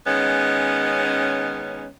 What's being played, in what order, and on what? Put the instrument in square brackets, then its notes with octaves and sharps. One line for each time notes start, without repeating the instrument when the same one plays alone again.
[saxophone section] D#3 G#3 B3 C#4